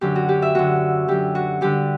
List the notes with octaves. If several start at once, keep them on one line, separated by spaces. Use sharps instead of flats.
F#2 D3 G4
F#4
G4
E5
F#2 D3 F#4
F#2 D3 G4
F#4
G2 D3 G4